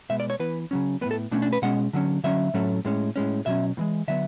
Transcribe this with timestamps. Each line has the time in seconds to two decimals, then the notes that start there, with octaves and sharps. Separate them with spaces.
0.09 B2 G#3 B3 E5
0.20 D5
0.30 C#5
0.40 E3 B3 B4
0.71 C#3 F#3 C#4
1.01 A2 G#3 B3 B4
1.11 A4
1.31 B2 A3 C#4 D4
1.42 D4
1.53 B4
1.62 B2 G#3 C#4 F#5
1.93 D3 F#3 C#4
2.24 D3 F#3 C#4 E5
2.54 A2 F#3 A3 C#4
2.85 A2 G#3 C#4
3.16 A2 G#3 C#4
3.46 B2 F#3 C#4 E5
3.77 A2 E3 G#3
4.08 D3 F#3 B3 E5